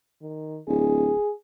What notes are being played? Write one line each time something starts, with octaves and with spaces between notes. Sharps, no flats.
D#3
D1 G#4